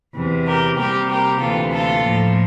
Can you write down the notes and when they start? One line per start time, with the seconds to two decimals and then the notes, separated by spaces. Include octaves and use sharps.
0.15 E2 C3 E3
0.46 G4 A#4
0.78 C3 G3 A#3 G4 A#4
1.09 G4 A#4
1.40 D2 C3 E3 A#3 F4 A4
1.71 F4 A4
2.03 A2 F3 A#3